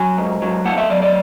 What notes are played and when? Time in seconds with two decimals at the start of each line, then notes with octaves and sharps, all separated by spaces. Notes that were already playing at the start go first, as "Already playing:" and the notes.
Already playing: F#3 G#5
0.18 G#2
0.42 F#3
0.65 A3 F#5
0.78 E5
0.90 F#3 D5
1.02 D5